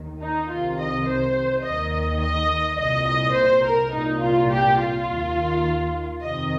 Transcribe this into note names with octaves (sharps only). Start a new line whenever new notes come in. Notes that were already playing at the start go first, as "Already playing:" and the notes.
Already playing: D#2 D#3
D#4
C2 C3 D#3 F4
D#5
C5
D#2 D#3 D#5
D#5
D#5
C2 A#2 D#5
D#5
C5
A#4
C2 A#2 D#4
F4
G4
F4
D#2 D#3
F2 C3 D#3 D#5